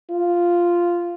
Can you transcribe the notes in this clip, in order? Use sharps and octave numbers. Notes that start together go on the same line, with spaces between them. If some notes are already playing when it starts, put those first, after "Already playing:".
F4